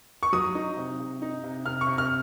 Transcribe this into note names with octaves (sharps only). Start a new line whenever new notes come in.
C#6
F#3 D#6
D#4
C3
C3
D#4
C3
C3 F6
C#6
C3
F6